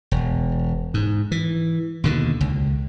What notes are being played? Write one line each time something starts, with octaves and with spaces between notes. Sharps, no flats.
E1
G#2
E3
D#2 B2 D3
C#2